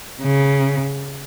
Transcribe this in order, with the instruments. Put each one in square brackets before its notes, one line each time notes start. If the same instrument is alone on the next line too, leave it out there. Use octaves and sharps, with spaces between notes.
[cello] C#3